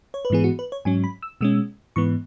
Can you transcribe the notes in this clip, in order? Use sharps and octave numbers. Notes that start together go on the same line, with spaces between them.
C#5
B4
G#2 E3 B3 G#4
F#4
B4
C#5
G#2 F#3 C#4 G#5
B5
E6
B2 G#3 C#4 E6
G#2 E3 B3 C#6